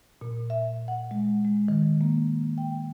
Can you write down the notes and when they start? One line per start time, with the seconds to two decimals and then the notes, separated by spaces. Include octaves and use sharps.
0.21 A#2
0.50 E5
0.88 F#5
1.11 G#3
1.45 G#3
1.68 D#3
2.01 A#3
2.58 G5